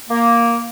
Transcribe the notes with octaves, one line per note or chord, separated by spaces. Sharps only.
A#3